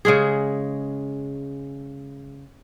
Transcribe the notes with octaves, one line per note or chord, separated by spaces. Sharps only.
C#3 G#3 G#4